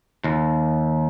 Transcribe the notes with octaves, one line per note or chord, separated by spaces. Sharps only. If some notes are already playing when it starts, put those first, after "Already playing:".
D#2